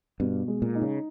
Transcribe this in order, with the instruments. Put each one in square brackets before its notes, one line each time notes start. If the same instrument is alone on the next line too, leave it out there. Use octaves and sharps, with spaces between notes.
[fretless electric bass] G2 [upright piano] B2
[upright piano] G#3
[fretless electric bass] A#2
[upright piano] D#4
[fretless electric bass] C#3